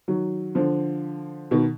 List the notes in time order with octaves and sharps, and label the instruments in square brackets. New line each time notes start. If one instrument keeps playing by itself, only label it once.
[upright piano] D#3 F#3
D3 F3
B2 D#3